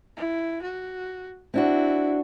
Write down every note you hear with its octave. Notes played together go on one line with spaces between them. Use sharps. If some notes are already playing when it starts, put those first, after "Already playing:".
E4
F#4
C4 D4 E4 F#4